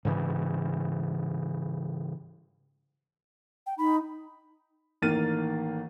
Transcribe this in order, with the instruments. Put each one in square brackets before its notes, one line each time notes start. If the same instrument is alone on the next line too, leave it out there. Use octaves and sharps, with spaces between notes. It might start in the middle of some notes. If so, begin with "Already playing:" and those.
[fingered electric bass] G#2 C#3 E3
[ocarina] G5
[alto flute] D#4 [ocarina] B5
[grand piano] A1 D#3 A#3 F6 A6 D#7